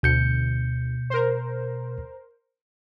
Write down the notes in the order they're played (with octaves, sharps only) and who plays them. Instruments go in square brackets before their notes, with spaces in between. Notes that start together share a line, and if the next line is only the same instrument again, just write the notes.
[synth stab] D2 [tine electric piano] B2 G6 C#7
[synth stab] A#4 C5